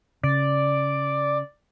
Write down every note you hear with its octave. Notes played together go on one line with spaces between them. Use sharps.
C#3 D5